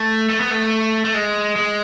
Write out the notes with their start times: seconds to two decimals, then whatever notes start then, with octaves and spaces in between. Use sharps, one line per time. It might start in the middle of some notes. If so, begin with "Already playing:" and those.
Already playing: A3
0.30 A3
0.40 B3
0.51 A3
1.05 A3
1.14 G#3
1.56 G#3